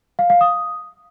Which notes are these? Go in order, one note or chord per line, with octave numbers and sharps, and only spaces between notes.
F5
F5
D#6